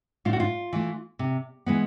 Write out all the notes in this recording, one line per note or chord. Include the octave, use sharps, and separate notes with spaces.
A2 F4
F#4
F4
E3 A3
C3
E3 G#3 B3